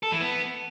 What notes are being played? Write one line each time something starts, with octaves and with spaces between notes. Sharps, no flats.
A4
E3
B3